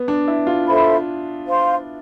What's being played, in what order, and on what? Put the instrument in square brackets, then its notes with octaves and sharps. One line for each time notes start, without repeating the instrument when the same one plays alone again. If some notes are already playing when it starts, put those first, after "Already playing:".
Already playing: [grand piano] B3
D4
E4
F4
[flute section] A4 C5 E5 B5
C5 F5 C6